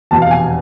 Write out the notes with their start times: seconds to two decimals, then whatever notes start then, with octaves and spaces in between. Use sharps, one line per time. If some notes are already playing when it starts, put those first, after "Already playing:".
0.11 F1 E2 B2 A5
0.22 F5
0.31 G#5